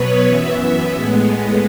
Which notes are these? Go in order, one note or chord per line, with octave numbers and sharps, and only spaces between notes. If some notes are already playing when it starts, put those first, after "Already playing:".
Already playing: B2 F#3 B3 B4 C#5
F#2 E3 B3 E5
A2 G#3 B3